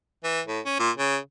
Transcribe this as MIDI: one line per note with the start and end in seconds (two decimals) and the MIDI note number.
0.24 0.41 52
0.47 0.60 45
0.66 0.76 61
0.79 0.91 46
0.98 1.18 49